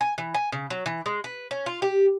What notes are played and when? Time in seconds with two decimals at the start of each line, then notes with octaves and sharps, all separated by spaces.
0.01 G#5
0.18 E3
0.34 G#5
0.52 C#3
0.70 F#3
0.86 E3
1.06 G#3
1.24 B4
1.51 C#4
1.66 F4
1.82 G4